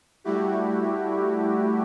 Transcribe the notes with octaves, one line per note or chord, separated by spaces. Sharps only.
G3 A3 E4 F#4 G4